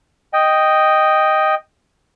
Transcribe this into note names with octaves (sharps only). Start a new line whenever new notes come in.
D#5 G5